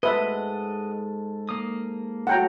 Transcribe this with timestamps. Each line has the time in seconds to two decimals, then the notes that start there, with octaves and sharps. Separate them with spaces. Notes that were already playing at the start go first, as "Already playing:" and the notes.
0.03 G#2 A4 B4 D#5 E5 F#5
1.49 A#3 D#6
2.27 A2 F#3 A3 F#5 G5 A#5